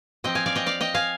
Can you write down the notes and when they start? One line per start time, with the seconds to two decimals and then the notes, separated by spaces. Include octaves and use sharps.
0.24 F3 C4 D#5 G5
0.35 F5 G#5
0.46 D5 F5
0.55 D#5 G5
0.66 D5 F5
0.81 D#5 G5
0.94 F5 G#5